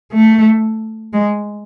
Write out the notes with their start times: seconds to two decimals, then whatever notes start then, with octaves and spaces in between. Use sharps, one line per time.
0.12 A3
1.13 G#3